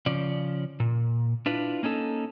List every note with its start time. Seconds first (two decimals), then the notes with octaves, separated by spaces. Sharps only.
0.06 C#3 F3 C#4 D5
0.80 A#2
1.46 D4 E4 F4 B4
1.83 A#3 C#4 D#4 A4